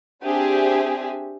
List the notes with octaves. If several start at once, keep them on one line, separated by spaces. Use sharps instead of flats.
C4 D4 G4 G#4 E5 G#5